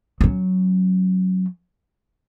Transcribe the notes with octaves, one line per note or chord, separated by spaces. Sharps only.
F#3 C#4